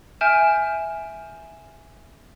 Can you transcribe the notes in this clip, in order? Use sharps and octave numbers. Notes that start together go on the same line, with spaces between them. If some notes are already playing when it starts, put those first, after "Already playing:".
E5 G#5 F6 G6 D7 E7